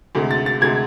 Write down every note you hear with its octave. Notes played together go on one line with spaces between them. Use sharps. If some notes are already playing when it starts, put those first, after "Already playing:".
D2 C3 G#3
A6
A6
D2 C3 G#3 G#6